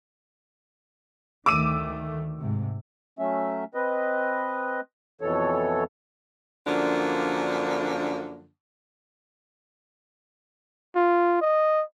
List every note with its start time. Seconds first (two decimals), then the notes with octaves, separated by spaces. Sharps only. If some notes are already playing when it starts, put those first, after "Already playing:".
1.46 D2 D#3 A3 D6 E6 D#7
2.38 G#2 C3
3.19 F#3 A3 C#4 E5
3.74 C4 B4 D#5
5.21 F2 B2 E3 A4 C#5
6.66 F#2 D3 F3 A#3 D4
10.96 F4
11.42 D#5